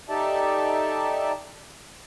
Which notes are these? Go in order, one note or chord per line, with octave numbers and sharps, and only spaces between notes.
D#4 G4 A4 D5 E5 A5